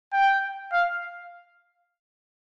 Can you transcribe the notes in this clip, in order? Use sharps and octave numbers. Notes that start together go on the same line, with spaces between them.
G5
F5